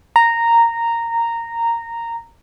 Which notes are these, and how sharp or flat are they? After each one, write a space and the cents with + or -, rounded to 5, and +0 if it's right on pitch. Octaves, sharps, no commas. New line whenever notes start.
A#5 -10